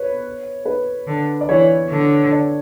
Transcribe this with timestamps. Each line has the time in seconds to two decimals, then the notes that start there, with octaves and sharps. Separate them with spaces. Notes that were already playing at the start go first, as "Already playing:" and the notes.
Already playing: B4 C#5
0.66 B4
1.07 D3
1.41 D5
1.49 E3 C#5
1.90 D3
2.32 D5